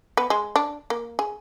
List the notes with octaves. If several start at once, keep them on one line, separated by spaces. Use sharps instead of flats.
B3
G#3
D4
A#3
G#4